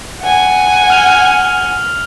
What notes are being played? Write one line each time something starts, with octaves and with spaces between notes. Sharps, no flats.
F#5 G#5
F6 F7